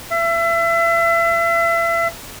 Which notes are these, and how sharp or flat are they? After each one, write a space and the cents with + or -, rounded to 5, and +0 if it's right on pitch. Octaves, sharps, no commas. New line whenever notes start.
E5 +35